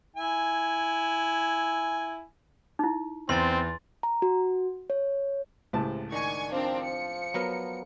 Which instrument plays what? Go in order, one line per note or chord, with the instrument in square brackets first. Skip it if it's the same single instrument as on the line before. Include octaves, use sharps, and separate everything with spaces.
[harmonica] E4 G#5
[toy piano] D#4 E4
[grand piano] E2 [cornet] C4 [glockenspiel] C6 A6
[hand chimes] A#5
F#4
C#5
[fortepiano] C#2 A2 A5 [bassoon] C3
[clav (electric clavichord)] D#3 [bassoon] D4 [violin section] G#5 C#6 G#6
[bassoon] F3 [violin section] C4 D4 A#4
[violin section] C#7
[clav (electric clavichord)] F#3 B3 A#4